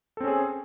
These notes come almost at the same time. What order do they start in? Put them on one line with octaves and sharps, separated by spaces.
A4 C4 C#4 G#4